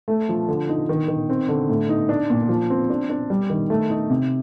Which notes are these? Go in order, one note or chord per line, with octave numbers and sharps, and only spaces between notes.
A3
F3
D3
D#4
D#3
D#3
C4
D3
A2
D#4
D4
A#2
F3
C4
D4
D4
G3
D#3
A3
D#4
C3